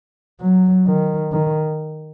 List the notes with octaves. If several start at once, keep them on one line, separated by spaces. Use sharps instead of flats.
F#3
D#3
D#3